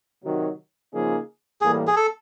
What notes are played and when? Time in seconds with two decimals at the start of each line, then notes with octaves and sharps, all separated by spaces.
0.24 C3 D#3 F#3
0.92 C#3 F3 A#3 D#4 G#4
1.61 A2 E3 G3 A#3 G#4
1.87 G#4
1.96 A4